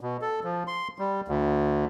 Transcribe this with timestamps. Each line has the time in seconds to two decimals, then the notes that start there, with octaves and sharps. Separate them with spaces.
0.01 B2
0.21 A4
0.44 F3
0.67 C6
0.99 G3
1.28 D2